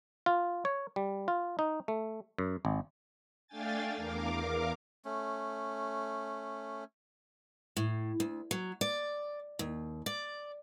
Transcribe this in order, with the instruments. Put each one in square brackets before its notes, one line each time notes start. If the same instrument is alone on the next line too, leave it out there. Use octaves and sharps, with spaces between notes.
[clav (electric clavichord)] F4
C#5
G3
F4
D#4
A3
F#2
G#1
[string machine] A3 D4 F5 G5 G#5 A6
E2 A#4 F5 D6
[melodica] A3 C#4
[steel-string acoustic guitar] A2
D2
F#3
D5
D#2
D5